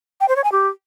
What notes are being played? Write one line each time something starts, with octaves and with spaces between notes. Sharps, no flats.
G5
C5
C#5
G#5
G4